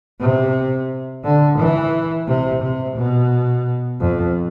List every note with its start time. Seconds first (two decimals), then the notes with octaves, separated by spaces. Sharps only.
0.20 C3
1.24 D3
1.59 E3
2.27 C3
2.62 C3
2.97 B2
4.00 F2